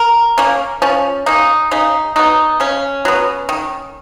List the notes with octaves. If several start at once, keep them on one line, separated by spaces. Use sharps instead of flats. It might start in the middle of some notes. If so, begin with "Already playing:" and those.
Already playing: A#4
A#3 C#4
F3 C#4
A#3 C#4 D#4
C#3 D#4
F#3 B3 D#4
C#3 C#4
F#3 B3
D#3